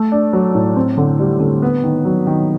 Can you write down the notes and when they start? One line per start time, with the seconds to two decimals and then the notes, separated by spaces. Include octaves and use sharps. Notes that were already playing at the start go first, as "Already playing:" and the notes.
Already playing: A3
0.12 D4
0.33 F#3
0.55 A2
0.76 C4
0.97 D3
1.20 G3
1.40 D3
1.62 B3
1.84 D#3
2.05 F#3
2.27 D#3